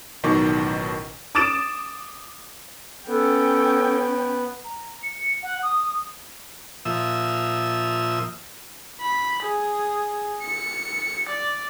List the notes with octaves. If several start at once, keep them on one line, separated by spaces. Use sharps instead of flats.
A1 B2 D#3 F#3 C#6 D6
D6 D#6 A6 D7 E7
B3 C#4 A4 G5
A#5
C#7
F#5
D#6
A#2 F3 E5 D#6 E6
B5
G#4
C#7
D5